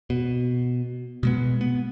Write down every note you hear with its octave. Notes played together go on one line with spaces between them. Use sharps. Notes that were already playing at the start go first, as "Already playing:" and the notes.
B2
B2 G#3 B3
B3